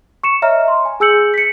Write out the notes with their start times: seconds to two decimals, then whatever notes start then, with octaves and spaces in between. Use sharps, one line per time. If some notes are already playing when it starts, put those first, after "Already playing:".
0.24 C#6 C#7 E7
0.42 C#5 D#5 E5 A#5 F6
0.68 C6
0.85 G#5
1.00 G#4 G#5 E6 G6 C#7 F#7
1.34 B6 C#7